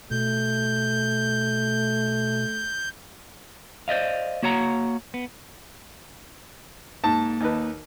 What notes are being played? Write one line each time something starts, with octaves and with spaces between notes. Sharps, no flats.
B2 A3 G6
C5 D5 D#5 F5
A#3 F#4 C#5 F#5 A#5
B3
G#2 A#3 A5
D#2 D#4 B4